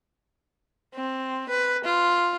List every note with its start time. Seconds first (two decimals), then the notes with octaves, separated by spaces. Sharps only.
0.95 C4
1.50 B4
1.85 F4